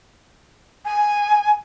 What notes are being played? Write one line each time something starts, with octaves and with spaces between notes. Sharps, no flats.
G#5